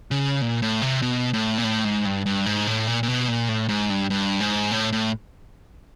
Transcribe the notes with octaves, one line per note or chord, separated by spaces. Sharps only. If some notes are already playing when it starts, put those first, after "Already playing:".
C#3
A#2
A2
C3
B2
A2
A#2
A2
G#2
G2
G2
G#2
A2
A#2
A#2
B2
A#2
A2
G#2
G2
G2
G#2
A2
A2